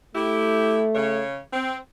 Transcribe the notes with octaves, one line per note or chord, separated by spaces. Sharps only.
A3 E4 G4
C#3 C#5
C4